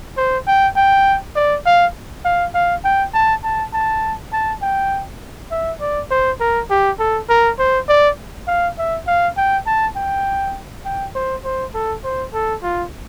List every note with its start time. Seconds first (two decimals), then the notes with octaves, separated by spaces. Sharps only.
0.17 C5
0.47 G5
0.76 G5
1.36 D5
1.66 F5
2.25 F5
2.55 F5
2.84 G5
3.14 A5
3.44 A5
3.73 A5
4.33 A5
4.62 G5
5.51 E5
5.81 D5
6.11 C5
6.40 A#4
6.70 G4
6.99 A4
7.29 A#4
7.59 C5
7.88 D5
8.48 F5
8.78 E5
9.07 F5
9.37 G5
9.66 A5
9.96 G5
10.85 G5
11.15 C5
11.45 C5
11.74 A4
12.04 C5
12.34 A4
12.63 F4